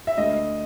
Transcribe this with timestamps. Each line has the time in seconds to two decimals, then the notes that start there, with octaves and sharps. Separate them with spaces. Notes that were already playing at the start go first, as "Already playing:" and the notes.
0.07 E5
0.17 D2 D#5